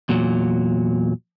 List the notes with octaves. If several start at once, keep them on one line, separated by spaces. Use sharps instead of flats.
E2 A#2 F#3